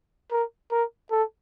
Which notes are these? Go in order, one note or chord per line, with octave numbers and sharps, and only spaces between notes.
A#4
A#4
A4